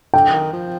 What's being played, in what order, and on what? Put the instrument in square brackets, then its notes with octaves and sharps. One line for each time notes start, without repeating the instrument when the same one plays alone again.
[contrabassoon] D3 [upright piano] G5
[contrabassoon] D#3
F3